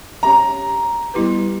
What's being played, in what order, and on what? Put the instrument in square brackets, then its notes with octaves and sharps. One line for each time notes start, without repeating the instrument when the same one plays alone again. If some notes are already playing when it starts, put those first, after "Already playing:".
[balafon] C#4 G4 C#5 [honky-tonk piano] A#5
[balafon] G3 B3 E4 G4 B4